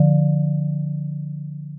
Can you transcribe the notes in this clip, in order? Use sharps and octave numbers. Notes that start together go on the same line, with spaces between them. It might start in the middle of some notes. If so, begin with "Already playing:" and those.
Already playing: D3 F3